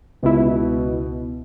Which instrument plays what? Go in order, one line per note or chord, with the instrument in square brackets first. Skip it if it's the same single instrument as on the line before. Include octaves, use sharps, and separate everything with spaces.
[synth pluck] C#2 E4 [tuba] B2